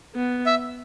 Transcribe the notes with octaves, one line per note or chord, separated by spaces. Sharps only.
B3
E5